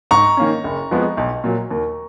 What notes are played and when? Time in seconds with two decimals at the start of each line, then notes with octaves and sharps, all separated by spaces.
0.11 G#2 A#5 C#6
0.37 D#3 A#3 C#4
0.64 F#1
0.91 F2 F3 G#3 B3
1.17 B1
1.44 A#2 F#3
1.71 D#2